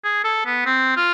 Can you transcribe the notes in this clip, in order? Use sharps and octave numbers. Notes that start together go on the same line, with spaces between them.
G#4
A4
B3
C4
F4